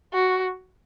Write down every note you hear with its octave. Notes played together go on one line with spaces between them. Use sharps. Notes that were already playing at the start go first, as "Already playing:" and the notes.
F#4